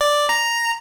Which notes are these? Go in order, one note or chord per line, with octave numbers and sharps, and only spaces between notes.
D5
A#5